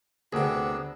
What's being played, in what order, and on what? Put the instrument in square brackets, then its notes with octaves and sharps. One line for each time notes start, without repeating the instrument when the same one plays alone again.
[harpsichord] D2 C3 [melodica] B3 D4 E6 [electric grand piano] G#4 A#4 F#5